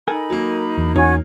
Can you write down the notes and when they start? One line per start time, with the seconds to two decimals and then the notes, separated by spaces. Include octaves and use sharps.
0.08 D#4 A4 A#4 G#5 B5
0.30 F#3 A#3
0.78 E2
0.96 E2 C#4 D#4 F#4 C#5 G#5